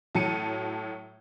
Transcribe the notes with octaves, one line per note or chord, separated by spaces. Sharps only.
A2 F#3 A5 C#7 D#7